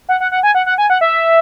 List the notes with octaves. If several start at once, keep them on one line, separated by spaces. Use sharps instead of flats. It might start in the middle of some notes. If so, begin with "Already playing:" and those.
F#5
F#5
F#5
G#5
F#5
F#5
G#5
F#5
E5